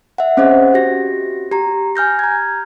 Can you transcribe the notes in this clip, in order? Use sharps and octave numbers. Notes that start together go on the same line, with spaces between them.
E5 F#5
C4 C#4 G#4 C5 D#5 F#5
F#4 G4 A#6
G4 A#5
G#5 F6 G6 A#6
A#5 G#6